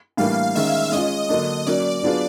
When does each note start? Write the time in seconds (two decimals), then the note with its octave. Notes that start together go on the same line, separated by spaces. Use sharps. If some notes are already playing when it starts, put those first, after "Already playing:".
0.17 A2 E3 G3 A#3 D4 F5
0.55 D#3 G#3 C#4 E5
0.92 G#3 C#4 F4 D#5
1.29 D3 F#3 A#3 D4 D#5
1.67 F#3 A#3 C#4 D5
2.03 F#3 B3 D4 F4 G#4